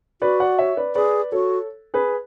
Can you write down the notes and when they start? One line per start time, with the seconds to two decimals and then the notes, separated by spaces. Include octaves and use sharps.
0.22 F#4 B4 D5
0.40 D5 F#5
0.59 C#5 E5
0.77 B4 D5
0.95 G#4 B4 D5
1.32 F#4 A4 C#5
1.94 G#4 B4